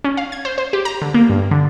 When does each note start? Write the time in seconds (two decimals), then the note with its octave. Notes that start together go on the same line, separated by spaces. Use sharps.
0.04 C#4
0.17 F5
0.32 G#6
0.45 C5
0.58 C5
0.73 G4
0.85 A#5
1.02 D3
1.14 A#3
1.30 G2
1.51 D3